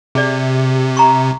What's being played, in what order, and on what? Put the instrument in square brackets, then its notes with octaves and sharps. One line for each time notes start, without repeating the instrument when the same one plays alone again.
[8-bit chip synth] C3 [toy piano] G#4 D5
[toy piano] A#5 C#6